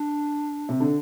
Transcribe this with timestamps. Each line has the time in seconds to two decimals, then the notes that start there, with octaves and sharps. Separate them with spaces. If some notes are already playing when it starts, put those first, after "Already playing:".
Already playing: D4
0.69 C3
0.80 D3